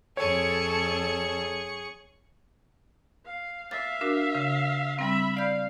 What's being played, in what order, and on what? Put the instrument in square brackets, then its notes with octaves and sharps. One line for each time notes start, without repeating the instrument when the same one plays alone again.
[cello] F2 A4 [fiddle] G#4 C#6 [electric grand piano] C#5
[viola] F5
[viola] E5 F5 [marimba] A6
[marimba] D4 F#4 A#4
C#3
[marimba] G3 C4 [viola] E5 B5
[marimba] D5 G6 [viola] F5